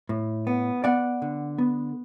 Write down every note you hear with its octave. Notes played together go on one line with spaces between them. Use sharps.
A2
B3
B3 D5 F#5
D3
B3